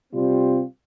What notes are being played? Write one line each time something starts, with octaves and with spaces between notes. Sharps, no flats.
C3 G3 C4 F4